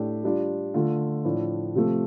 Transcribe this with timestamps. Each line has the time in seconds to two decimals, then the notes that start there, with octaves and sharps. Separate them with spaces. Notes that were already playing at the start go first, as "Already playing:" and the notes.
Already playing: A2 A3 D4 G4
0.24 G3 D4 F4
0.74 D3 A3 F4
1.25 A2 F3 D4
1.75 C3 F3 A3